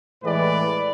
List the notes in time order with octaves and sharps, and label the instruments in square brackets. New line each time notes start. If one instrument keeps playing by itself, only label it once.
[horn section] A2 E3 G#3 B4 D5